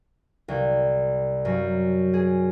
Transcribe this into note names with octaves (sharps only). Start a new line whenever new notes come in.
C2
F#2
G#4